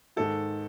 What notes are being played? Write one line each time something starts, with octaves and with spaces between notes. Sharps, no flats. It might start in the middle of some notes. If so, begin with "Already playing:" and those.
G#2 D#3 A4